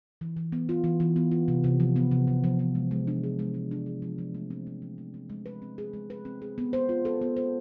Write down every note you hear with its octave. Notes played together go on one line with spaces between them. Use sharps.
E3
E3
B3
F4
E3
E3
B3
F4
C3
C3
F3
B3
C3
C3
F3
B3
G#3
G#3
D4
G#4
G#3
G#3
D4
G#4
F3
F3
A3
C4
F3
F3
A3
C4
G#3
B4
C4
G#4
G#3
B4
C4
G#4
B3
C5
F4
A4
B3
C5